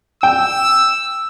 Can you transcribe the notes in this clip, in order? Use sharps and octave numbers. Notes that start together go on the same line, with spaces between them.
G5 E6